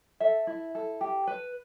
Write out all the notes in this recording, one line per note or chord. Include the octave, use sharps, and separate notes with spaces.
A4 E5
E4
A4
G4
B4